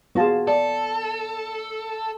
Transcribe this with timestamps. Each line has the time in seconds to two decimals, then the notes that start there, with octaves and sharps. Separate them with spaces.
0.15 B3 F4 F#4 G#4 A5
0.47 A4 D5